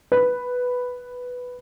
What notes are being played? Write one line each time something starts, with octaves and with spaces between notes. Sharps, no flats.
B4